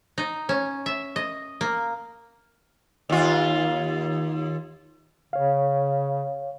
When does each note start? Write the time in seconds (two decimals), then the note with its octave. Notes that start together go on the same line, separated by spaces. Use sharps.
0.18 D#4
0.49 C#4
0.86 E5
1.16 D#5
1.61 A#3
3.09 D#2 F4
5.33 C#3 C#5 F5